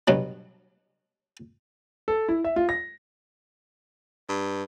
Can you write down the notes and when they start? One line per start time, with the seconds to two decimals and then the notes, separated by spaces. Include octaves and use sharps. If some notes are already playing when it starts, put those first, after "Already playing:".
0.08 G2 B2 F#3
2.08 A4
2.29 E4
2.44 E5
2.56 F4
2.69 A#6
4.29 G2